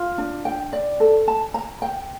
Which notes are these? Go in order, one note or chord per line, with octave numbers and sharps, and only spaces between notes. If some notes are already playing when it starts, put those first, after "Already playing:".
Already playing: F4
D4
G5
D5
A4
A5
A#5
G5